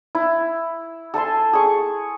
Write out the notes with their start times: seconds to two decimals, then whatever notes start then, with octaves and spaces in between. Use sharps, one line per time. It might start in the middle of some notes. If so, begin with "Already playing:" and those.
0.15 E4
1.14 A4 G#5 A5 C6
1.53 G#4 C#6